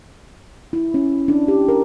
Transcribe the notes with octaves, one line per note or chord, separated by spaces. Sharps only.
E4
C#4
D4
G4
A#4